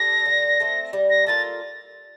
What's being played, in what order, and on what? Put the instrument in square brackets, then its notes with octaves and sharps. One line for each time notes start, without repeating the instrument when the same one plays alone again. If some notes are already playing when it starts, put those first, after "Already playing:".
Already playing: [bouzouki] G3 D4 A4 [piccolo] A#6
[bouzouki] D3
A3 C4
G3
[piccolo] A#6
[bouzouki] A#3 F4 A4 [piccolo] A6